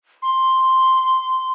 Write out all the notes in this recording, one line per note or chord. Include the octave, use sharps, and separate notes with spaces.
C6